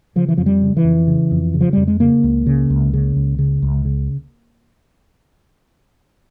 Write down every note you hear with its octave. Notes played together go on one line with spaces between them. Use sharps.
C#3 F3
E3
F2 F3
G3
C#3
E3
F2
C#3
F2
C#3
F3
F2 G3
G#3
C#3 A#3
C#2
C#3
C#2
C#3
C#2
C#3
C#2
C#3